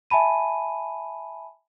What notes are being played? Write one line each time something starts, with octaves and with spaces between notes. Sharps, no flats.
E5 G#5 A5 B5 D#7